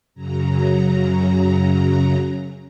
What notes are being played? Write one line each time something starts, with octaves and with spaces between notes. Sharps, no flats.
F#2 C#3 F#3 A#5